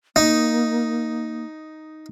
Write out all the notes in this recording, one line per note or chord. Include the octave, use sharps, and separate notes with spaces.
A#3 D#4